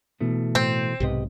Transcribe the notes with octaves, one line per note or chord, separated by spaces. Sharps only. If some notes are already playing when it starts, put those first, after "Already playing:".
B2 E3 A3
A2 C4
B1 G#2 C3 G4 B4 D#5